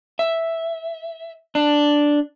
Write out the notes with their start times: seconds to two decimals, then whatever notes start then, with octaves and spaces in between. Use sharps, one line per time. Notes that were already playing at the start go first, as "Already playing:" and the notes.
0.19 E5
1.55 D4